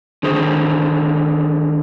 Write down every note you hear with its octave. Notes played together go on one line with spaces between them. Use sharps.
D3 D#3 G#4 C5